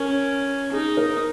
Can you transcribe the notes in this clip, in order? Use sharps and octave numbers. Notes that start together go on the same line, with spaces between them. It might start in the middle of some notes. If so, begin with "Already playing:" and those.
Already playing: C#4 A#4
D#4 G#4
A#4